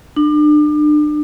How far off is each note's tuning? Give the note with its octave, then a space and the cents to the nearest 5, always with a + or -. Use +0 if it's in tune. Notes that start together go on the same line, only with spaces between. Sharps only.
D4 +35